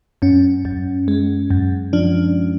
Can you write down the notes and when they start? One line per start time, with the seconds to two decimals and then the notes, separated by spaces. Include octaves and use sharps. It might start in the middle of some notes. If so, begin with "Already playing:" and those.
0.22 F#2 C#4
0.65 F#2
1.08 G#3
1.50 F#2
1.93 F3 D4